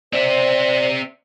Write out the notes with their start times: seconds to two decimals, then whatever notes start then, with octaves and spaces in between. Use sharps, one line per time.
0.13 C4 C5 D5 E5